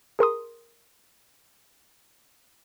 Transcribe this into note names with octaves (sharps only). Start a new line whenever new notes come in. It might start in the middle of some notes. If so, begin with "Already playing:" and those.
G#4 A#4 C6 D#6